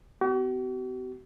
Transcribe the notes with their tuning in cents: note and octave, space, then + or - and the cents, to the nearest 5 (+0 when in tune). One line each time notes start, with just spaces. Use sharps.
B3 +45 F#4 +45